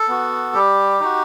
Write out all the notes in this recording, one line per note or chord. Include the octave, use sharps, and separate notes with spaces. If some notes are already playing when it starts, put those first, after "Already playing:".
Already playing: A4
B3 F#4
G3 G4
D#4 F#4